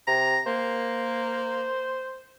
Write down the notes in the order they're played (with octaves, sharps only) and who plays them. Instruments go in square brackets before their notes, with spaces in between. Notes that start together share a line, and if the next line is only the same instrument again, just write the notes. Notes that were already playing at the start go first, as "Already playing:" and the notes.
[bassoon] C3 [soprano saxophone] A#5
[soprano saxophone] A#3 [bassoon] C5